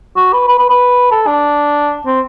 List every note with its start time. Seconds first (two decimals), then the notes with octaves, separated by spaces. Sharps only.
0.16 F#4
0.33 B4
0.48 B4
0.59 B4
0.70 B4
1.11 A4
1.27 D4
2.06 C4